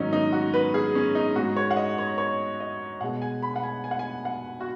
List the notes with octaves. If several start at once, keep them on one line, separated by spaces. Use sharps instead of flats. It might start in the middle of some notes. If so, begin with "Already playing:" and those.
Already playing: G#2 D#3 F#3 C#4 D#4
D#4
F#4
B4
G#4
C#4
D#4
G#2 G#3 F#4
C#5
F#5
D#5
C#5
C#5
D#5
B2 G#3 F#5
G#5
B5
F#5
G#5
G#5
F#5
G#5
F#5
F#4